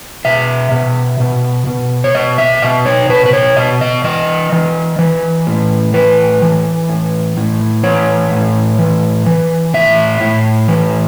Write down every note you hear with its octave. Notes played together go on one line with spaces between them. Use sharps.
B2 E5
B2
B2
B2
C#5
B2 D#5
E5
B2 D#5
C#5
B2 B4
B4
C#5
B2 D#5
D#5
E3 D#5
E3
E3
A2
E3 B4
E3
A2
A2
E3 C#5
A2
E3
E3
A2 E5
A2
E3